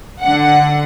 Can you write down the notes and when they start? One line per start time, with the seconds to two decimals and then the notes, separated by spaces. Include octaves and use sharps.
0.21 D3 F#5